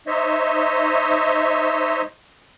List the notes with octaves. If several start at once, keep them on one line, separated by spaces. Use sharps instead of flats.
D#4 C5 C#5 D#5 E5